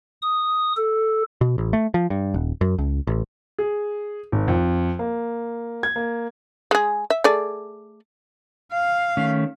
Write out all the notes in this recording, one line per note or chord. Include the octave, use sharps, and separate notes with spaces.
D#6
A4
B2
A1
A3
F3
G2
D#1
F#2
C#2
A1
G#4
G#1
F2
A#3
G#6
A#3
G#3 G#4
E5
A3 G#4 D5
F5
D#3 A3 C#4